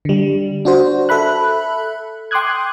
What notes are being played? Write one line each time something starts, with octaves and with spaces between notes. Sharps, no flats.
D3 G3
D4 F#4 C5
A4 E5 B5 F#6
G5 C6 D6 D#6 F#6 G#6